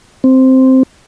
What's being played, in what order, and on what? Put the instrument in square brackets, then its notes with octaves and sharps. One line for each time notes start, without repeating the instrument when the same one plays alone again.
[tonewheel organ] C4